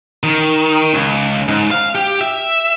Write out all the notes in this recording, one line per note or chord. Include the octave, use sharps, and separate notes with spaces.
D#3
C#2
G#2
F5
G4
E5